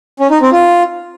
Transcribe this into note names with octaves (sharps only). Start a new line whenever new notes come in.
C#4
D#4
C4
F4